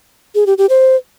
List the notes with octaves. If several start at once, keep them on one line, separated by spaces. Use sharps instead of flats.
G#4
G4
G4
C5